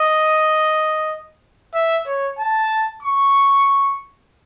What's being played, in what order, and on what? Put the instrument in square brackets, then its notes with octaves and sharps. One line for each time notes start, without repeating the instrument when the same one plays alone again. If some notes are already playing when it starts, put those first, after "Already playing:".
Already playing: [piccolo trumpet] D#5
E5
C#5
A5
C#6